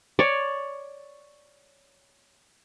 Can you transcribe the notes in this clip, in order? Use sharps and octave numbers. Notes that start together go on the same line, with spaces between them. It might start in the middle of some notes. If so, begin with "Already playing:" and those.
C#5 D5